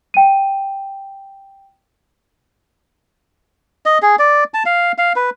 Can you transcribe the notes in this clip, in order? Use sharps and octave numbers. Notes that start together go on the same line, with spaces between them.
G5 D#7
D#5
G#4
D5
A5
F5
F5
B4